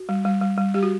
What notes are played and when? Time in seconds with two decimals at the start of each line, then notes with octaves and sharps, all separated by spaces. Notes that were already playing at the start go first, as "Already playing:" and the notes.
Already playing: F#4
0.09 G3
0.25 G3
0.41 G3
0.58 G3
0.74 G3 G4
0.83 F#4